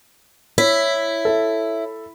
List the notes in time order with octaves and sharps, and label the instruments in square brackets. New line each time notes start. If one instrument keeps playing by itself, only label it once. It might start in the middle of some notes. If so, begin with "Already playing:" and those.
[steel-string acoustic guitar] E4 [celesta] C#5 B6
[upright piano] A4 E5